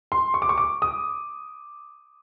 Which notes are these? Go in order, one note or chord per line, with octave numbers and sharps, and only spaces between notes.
C6
C#6
D6
C#6
D6
D#6